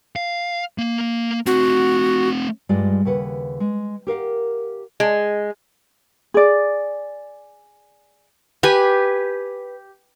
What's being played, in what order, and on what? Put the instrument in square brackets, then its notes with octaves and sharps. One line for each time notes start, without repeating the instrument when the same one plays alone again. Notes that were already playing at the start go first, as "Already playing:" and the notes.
[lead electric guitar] F5
A#3 F5
[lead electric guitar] A3 C4 [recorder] F#4
[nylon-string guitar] G2 G3 G#3 F4 D5
D#2 C#3 B4 F#5
G#3
G4 A#4 F5 F#5
[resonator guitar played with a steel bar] G#3
[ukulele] G#4 D5
[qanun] G4 B4 G#5